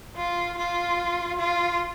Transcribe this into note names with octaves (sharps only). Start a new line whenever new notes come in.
F4
F4
F4